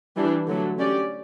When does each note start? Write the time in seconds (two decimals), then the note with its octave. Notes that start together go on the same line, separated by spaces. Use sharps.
0.16 E3 G3 D4
0.47 D3 F#3 A3
0.79 C#4 G4 D5